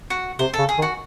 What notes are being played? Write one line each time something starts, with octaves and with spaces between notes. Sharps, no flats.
F#4
C3 C5
A4
C#3
G#4
D#3
F#4